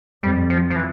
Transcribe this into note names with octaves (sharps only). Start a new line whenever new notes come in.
F2 G3
F3
F3
E3